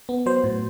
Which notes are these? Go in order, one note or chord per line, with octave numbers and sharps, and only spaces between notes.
B3
F#3 C5
A2